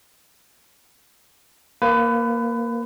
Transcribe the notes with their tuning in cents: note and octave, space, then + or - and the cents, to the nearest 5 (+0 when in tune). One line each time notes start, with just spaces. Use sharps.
A#3 +0 B4 +25